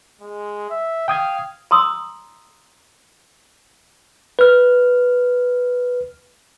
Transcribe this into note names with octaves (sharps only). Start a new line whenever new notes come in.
G#3
E5
F5 G5 D#6 G#6
A#5 C6 D#6 E6
B4 F6